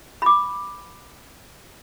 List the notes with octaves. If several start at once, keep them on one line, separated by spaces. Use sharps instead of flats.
B5 D6